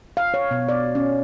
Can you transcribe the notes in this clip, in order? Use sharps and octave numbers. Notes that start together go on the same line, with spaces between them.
F5
C#5
B2
D5
C#4